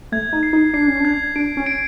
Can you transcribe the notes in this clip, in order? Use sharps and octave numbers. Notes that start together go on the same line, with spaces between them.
A3 G#6
D#4
C7
D#4
D4 C7
C#4
D4 G#6
D4 D7
C#4
D7